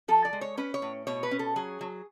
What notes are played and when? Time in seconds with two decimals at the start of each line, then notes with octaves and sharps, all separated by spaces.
0.08 F3 A4
0.25 D5
0.33 G#3
0.41 C#5
0.57 C#4 B4
0.74 C#5
0.82 A2
1.07 B2 C#5
1.23 B4
1.31 C#4
1.39 A4
1.56 F#3 G#4
1.81 F#3